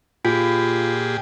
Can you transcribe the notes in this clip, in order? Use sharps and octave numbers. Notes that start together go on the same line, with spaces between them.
A#2 F4 G4 G#4